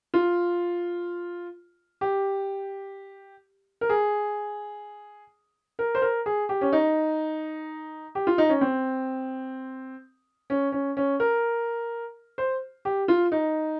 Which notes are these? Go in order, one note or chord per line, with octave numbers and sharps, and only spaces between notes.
F4
G4
A#4
G#4
A#4
C5
A#4
G#4
G4
C#4
D#4
G4
F4
D#4
C#4
C4
C#4
C#4
C#4
A#4
C5
G4
F4
D#4